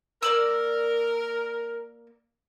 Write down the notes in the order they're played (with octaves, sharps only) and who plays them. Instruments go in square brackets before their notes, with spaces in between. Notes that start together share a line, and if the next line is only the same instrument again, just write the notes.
[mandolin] A#3 D5 E6 [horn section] A#4